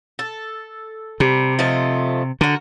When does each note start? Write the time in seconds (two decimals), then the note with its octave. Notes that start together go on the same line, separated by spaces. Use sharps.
0.19 A4
1.20 C3 G3
1.59 F3 A3 D#5
2.41 D3 F#4 A#4